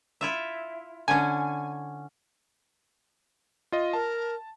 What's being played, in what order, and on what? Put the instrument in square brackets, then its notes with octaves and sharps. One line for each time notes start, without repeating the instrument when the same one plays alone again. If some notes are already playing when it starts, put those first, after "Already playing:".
[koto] E4 F4 E5
[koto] D3 C#4 [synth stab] G#5
[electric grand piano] F4 D#5
[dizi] A#4 [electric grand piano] A5